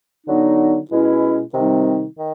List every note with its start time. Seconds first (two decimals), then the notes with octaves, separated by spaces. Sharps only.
0.27 D3 F#3 B3 D#4
0.90 B2 G#3 C#4 E4
1.54 C3 D#3 G3 C4 D#4
2.19 D#3